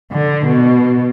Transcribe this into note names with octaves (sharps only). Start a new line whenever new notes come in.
D3
B2